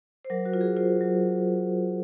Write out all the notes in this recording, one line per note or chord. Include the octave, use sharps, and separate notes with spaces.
C5
F#3 A#4
F#4
F4
G#4
F4 C5
F#3